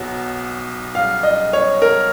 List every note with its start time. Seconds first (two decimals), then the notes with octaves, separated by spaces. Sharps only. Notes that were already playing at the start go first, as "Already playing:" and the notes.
Already playing: B1 B2 F#3
0.95 F5
1.23 D#5
1.53 C#5
1.82 A#4